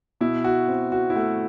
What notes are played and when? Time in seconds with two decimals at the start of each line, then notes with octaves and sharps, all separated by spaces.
0.21 B2 E4
0.44 F#4
0.68 C4
0.92 F#4
1.10 E4
1.16 A3 F#4